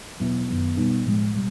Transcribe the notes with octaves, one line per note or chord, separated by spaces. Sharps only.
E2 B2 F#3 B3 E4
F#2 D#3 F#3 B3
B2 G3 B3 D#4
A2 F3 G#3
B2 G3